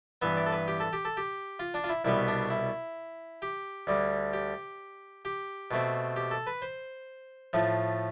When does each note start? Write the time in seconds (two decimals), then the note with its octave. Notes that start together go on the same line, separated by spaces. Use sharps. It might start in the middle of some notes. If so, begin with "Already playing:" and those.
0.22 G2 E3 B3 E5
0.37 D5
0.46 A4
0.52 B4
0.68 G4
0.80 A4
0.93 G4
1.05 A4
1.17 G4
1.59 F4
1.74 D4
1.84 F4
1.89 E4
2.05 C2 B2 G3 B3 E4
2.28 D4
2.50 E4
3.42 G4
3.87 D2 D3 G3
4.33 G4
5.25 G4
5.71 B2 A3 C4
6.16 G4
6.31 A4
6.47 B4
6.62 C5
7.53 A2 F3 A3